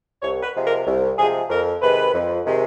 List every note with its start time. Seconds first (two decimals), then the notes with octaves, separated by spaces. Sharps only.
0.22 C2 C#5
0.43 B4
0.55 C3 F3 G#3
0.65 A#4
0.86 C2
1.18 C3 F3 G#3 G#4
1.50 F2 A#4
1.82 C3 D#3 G#3 B4
2.14 F2
2.45 C3 D#3 G#3